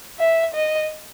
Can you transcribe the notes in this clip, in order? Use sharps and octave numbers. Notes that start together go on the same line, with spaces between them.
E5
D#5